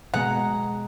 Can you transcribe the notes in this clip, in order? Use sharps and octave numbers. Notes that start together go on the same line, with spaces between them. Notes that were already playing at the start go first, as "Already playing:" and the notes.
B2 G#3 B3 F#5 A#5